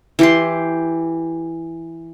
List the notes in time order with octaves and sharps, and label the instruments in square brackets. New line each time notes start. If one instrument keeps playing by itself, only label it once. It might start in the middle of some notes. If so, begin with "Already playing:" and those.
[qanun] E3 G4 C6